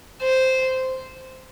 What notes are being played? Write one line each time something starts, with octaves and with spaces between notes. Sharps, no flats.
C5